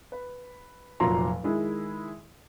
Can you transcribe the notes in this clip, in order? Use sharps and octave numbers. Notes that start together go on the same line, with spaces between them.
B4
F1 F2 A#2 F#3 A#5 C6
D#3 G#3 E4